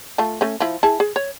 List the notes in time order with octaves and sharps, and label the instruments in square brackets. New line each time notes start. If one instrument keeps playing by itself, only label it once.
[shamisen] A3 F4 A5
A3 C#4
F3 E4
E4 G#4 A5
G#4
C#5